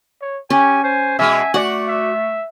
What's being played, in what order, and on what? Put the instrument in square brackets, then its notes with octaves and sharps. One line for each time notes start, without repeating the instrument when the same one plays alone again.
[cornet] C#5
[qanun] C#4 [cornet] G4 [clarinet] G#5
[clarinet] C5 [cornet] G#5
[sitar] B2 G#3 [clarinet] E5 [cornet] G#5
[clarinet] A3 [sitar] F#4 D5 [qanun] F#5
[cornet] E5